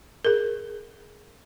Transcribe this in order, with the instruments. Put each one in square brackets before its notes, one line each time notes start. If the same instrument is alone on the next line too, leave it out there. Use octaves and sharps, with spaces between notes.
[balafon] G#4 A#4